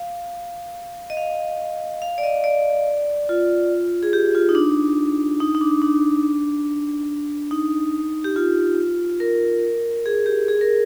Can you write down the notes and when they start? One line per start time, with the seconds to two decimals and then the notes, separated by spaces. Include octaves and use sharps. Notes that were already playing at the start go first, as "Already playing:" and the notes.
Already playing: F5
1.10 D#5
1.17 F5
2.02 F5
2.18 D5
2.23 D#5
2.44 D5
3.29 F4
4.03 G#4
4.13 G4
4.35 F4
4.49 D#4
4.55 D4
5.40 D#4
5.55 D#4
5.61 D4
5.82 D4
7.51 D#4
8.24 G4
8.36 F4
9.20 A#4
10.06 G#4
10.26 G4
10.48 G#4
10.61 A#4